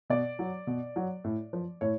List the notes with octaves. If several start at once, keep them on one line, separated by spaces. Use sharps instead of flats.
B2 D5
F#3
B2
F#3
A2
F3
A2 C#5